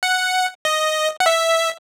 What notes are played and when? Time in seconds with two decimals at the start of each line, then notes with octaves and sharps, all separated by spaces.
0.03 F#5
0.65 D#5
1.20 F#5
1.26 E5